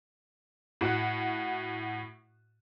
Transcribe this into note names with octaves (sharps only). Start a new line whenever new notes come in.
A2 F#4 F#5 F#6